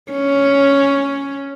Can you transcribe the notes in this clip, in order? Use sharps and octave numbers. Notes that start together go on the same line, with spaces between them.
C#4